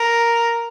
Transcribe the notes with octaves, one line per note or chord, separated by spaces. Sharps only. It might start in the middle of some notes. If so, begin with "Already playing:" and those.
Already playing: A#4